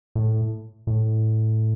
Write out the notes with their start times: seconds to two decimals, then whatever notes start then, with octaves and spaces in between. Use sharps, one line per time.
0.15 A2
0.87 A2